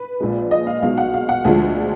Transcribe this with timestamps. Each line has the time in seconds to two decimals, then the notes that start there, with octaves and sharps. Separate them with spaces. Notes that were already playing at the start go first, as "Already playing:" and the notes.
Already playing: B4
0.20 A#1 A#2 F3 G#3
0.51 D#5
0.67 F5
0.82 B1 B2 G#3 F5
0.98 F#5
1.14 F5
1.29 F#5
1.45 D2 D3 F3 G#3